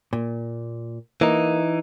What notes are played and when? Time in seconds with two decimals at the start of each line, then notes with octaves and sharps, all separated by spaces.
0.13 A#2
1.21 E3 A#3 D#4